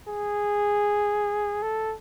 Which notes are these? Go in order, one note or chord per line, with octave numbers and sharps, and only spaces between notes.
G#4
A4